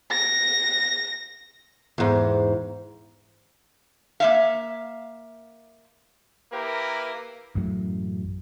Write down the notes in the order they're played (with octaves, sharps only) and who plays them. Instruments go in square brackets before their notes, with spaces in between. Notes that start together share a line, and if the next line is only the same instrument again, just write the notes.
[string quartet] A#6
[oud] E2 G#2
[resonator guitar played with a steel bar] A#3 E5 F5
[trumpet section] A#3 E4 G4 A#4 B4
[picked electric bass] A1 F#2 A2 F#3